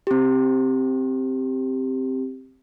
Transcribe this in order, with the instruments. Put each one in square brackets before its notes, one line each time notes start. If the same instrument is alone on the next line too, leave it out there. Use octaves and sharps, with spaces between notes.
[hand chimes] C4 G4